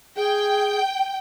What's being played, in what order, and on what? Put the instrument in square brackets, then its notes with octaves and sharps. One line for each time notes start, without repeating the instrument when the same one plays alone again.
[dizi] G#4 [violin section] G5